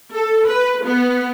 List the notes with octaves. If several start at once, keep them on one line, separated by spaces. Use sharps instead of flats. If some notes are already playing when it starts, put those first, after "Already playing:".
A4
B4
B3